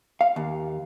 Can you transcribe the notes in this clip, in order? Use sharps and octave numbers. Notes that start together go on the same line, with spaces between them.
F5
D#2